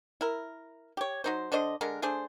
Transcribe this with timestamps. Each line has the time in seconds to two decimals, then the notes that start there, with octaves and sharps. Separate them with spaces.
0.21 E4 A#4
0.97 G4 C#5
1.24 F#3 D#4 C5
1.52 D3 D4 C5 D#5
1.81 D3 G#3 A#4
2.02 A3 D4 G#4 C5